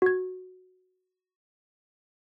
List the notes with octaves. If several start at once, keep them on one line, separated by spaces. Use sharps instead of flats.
F#4 G#6